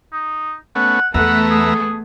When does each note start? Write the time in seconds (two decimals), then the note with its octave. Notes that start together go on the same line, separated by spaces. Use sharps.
0.12 D#4
0.75 A3 B3 C#4 F#5
1.14 E2 A3 B3 A4 B4 E5 F#5 A#5
1.50 G#4